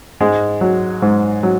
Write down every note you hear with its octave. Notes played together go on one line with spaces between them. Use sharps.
G#2 G#3
F#3
G#2
F#3